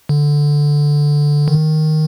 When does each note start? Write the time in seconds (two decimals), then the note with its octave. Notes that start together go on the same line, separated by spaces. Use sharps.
0.09 D3
1.48 D#3